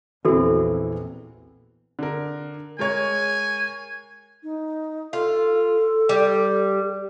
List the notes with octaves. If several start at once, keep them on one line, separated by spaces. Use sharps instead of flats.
A#1 E2 E3 C4 F#4 A4
D3 A#4
G#3 A#4 C#5 G#5
D#4
F4 A4
G3